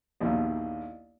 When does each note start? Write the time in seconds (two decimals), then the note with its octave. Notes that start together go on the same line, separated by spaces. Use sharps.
0.21 A#1 D#2 B2 D#4 E4